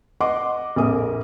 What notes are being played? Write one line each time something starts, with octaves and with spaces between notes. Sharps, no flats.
D#5 F#5 C6 D6
A#1 F2 A#4 D#6